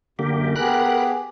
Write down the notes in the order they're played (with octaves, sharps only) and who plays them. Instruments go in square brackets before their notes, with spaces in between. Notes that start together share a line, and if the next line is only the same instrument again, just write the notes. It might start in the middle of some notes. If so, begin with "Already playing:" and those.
[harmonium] F#2 [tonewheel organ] D3 A#3 G4
[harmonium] B3 G4 G#4 [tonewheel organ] A#4 B5 F#6